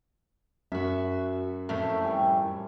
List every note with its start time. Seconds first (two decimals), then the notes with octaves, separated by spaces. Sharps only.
0.72 F#2 F#4 E5
1.69 F2 A2 D#3 A3
2.03 G3 G#5